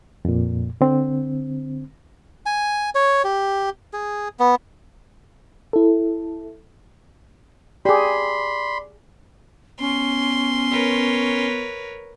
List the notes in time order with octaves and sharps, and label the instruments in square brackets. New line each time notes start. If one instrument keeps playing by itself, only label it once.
[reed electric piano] F2 A#2
D3 C4
[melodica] G#5
C#5
G4
G#4
B3
[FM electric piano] E4 A4
[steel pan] G4 G#4 [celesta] D5 D6 [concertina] B5 C6
[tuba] B3 [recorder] C#4 [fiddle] C6
[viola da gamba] A#4 B4 C#5